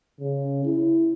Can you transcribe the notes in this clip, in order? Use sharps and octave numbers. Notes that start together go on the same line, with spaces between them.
C#3
E4